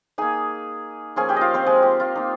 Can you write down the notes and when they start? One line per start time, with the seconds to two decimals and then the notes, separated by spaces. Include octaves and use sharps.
0.18 A#3 D#4 G#4 G#5
1.16 F3 A#3 C#4 F4 G#4 G#5
1.29 G4 G5
1.36 F4 D#5 F5
1.54 C4 C5
1.66 G#3 G#4
1.82 G4
2.00 F4
2.16 A#3 D#4